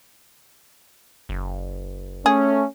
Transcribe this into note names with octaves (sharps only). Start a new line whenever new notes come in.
F#1
A3 C#4 G#4